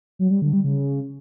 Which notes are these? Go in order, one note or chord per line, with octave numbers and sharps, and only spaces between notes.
F#3
G3
D3
G3
C#3